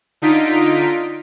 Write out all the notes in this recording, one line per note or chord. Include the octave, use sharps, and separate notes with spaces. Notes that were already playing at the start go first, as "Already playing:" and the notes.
D3 D#4 F4 B6 D7